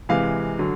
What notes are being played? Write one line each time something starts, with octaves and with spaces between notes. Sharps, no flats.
C3 E3 G#3 F5
D3 F#3